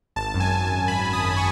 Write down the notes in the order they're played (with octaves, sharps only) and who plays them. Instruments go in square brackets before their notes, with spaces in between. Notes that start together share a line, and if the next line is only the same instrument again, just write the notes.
[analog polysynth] G#1 A5
F#2
G#5
G#1
A5
F#2
G#1 B5
G#1
D#6
F#2
C#6